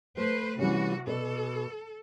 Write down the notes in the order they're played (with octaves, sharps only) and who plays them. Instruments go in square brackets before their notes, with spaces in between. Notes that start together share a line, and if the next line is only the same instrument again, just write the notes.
[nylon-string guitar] A3 [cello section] B4 C5
[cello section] C3 F#4 [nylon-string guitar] E3 G3 C#4
[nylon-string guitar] B2 B4 D5 [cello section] A4